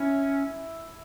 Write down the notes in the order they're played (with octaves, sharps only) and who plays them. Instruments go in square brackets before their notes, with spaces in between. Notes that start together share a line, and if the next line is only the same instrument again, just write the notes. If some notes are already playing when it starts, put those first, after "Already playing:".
Already playing: [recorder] C#4 [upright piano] E4